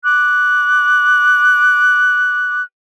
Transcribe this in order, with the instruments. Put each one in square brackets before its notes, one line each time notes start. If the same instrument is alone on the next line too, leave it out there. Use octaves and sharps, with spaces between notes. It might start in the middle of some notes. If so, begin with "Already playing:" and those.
[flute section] D6 F#6